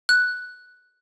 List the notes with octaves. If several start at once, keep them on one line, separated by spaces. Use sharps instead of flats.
F#6